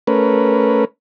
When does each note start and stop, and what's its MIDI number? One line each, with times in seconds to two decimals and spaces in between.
0.07 0.85 57
0.07 0.85 61
0.07 0.85 70
0.07 0.85 71